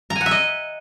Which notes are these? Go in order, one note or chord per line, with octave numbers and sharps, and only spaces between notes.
A#5
G#5
F#5
E5
D#5